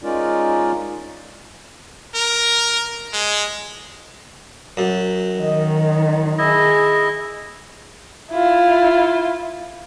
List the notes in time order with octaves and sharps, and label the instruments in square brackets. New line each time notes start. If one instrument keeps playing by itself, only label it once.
[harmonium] G#3 C#4 D#4 F4 A#4 D5
[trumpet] A#4
G#3
[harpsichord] F#2
[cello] D#3 [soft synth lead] D#5
[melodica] E4 D#5 [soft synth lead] G#4
[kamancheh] E4 F4